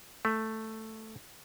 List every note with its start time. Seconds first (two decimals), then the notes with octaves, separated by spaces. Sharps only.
0.25 A3